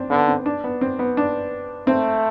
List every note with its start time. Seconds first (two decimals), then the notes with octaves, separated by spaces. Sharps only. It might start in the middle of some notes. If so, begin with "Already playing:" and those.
Already playing: C4 D4
0.10 D3 B3
0.28 C4
0.46 D4
0.64 B3
0.81 C4
0.99 B3
1.17 D4
1.87 A3 C4